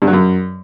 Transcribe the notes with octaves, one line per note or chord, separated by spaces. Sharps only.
G2
F#3
F#2